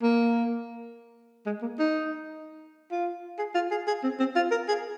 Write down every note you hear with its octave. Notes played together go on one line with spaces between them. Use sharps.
A#3
G#3
A#3
D#4
F4
G#4
F4
G#4
G#4
C4
C4
F4
A#4
G#4